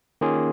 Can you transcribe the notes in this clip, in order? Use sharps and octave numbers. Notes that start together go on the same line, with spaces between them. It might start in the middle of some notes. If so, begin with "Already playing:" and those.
D#3 A#3 C#4 F4 G#4